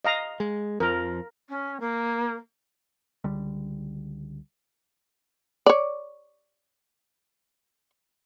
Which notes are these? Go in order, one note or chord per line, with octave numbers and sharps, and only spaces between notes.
D#5 F5 A#5
G#3
F2 F3 A#4
C#4
A#3
C#2 D3 G3
C#5 D5